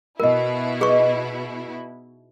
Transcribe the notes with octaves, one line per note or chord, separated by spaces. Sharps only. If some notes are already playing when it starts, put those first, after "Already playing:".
B2 E4 A#4 D#5
D#4 G#4 B4 C#6